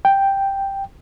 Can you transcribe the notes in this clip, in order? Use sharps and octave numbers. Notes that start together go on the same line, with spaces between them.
G5